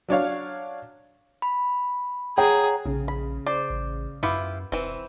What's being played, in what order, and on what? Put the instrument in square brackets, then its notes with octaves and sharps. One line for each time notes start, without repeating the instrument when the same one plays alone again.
[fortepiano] F#3 D4 C#5 F5
[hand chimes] B5
[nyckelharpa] G#4 [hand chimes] C#5 F#5 A#5 [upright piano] G5
[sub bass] A#1 [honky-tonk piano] C#3
[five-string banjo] B5
[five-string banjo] C5 [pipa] D5
[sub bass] A1
[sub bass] F#2 [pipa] B3 [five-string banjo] E4 F4 G4
[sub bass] E1 [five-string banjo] E3 C4